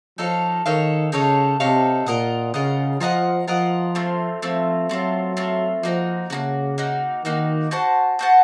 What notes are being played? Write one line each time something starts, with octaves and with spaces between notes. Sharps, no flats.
F3 D#4 A4 C#5 F5
D#3 D#4 A4 C#5 F5
C#3 D#4 A4 C#5 F5
C3 D#4 A4 C#5 F5
A#2 F4 A#4 D#5 F#5
C#3 F4 A#4 D#5 F#5
F3 F4 A#4 D#5 F#5
F3 F4 A#4 D#5 F#5
A3 C4 F4
F3 A3 C4 F4
F#3 A3 C4 F4
A3 C4 F4
F3 A#3 D#4 F#4
C#3 A#3 D#4 F#4
A#3 D#4 F#4
D#3 A#3 D#4 F#4
F#4 C5 F#5 A5
F#4 C5 F#5 A5